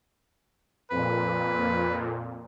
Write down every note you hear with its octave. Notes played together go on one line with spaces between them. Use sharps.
F2 A#2 B4